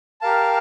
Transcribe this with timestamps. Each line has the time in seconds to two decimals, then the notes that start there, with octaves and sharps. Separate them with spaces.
0.21 G4 A#4 F5 A5